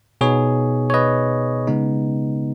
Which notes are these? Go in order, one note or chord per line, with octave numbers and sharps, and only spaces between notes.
B2 B3 D#4 G#4 C#5
C#5
B4 D#5
C#3 G#3 B3 D#4